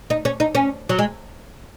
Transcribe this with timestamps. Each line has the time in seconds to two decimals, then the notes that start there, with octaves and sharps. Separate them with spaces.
0.10 D#4
0.25 C#4
0.40 D#4
0.55 C#4
0.89 F#3
0.99 G#3